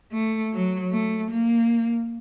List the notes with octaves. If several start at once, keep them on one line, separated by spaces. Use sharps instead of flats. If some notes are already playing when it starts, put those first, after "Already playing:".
A3
F#3
A3
A#3